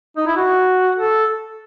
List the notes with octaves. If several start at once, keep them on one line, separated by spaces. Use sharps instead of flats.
D#4
E4
F#4
A4